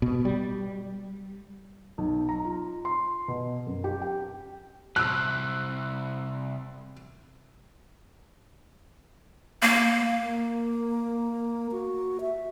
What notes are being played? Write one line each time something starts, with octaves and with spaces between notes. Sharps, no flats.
B2
G3
B1
A#5
F4
C6
B2
F#2
G4
G5
C2 E6 F#6
A#3
A#3
F#4
E5